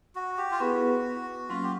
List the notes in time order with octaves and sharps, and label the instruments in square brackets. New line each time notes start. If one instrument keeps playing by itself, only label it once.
[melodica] F#4
G4
F4
[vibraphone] B3 E4 G#4 B4 [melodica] F#4
[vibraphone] F#3 A#3 C#4 [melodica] F4
[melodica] G4